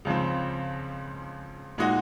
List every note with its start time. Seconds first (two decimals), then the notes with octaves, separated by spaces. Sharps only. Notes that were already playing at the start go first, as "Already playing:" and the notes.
0.05 C#2 C#3 F3 C4
1.78 A#2 G#3 D#4 F#4